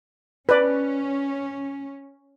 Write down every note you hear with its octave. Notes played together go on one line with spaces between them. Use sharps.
C#4 B4 D5